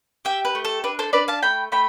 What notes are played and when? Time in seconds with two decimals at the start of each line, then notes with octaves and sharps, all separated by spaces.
0.25 G4 E5 G5
0.45 B4
0.55 A3
0.65 A4
0.84 D4 B4
0.99 A4 C5
1.13 D4 B4 D5
1.28 F5 A5
1.43 A3 G5 B5
1.72 A3 G5 B5